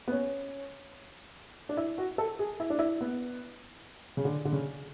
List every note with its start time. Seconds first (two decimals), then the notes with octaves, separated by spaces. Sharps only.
0.08 B3
0.12 C#4
1.69 D4
1.77 E4
1.98 F#4
2.18 A4
2.39 G#4
2.60 E4
2.70 D4
2.79 E4
3.01 B3
4.17 C#3
4.25 D3
4.45 D3
4.52 C#3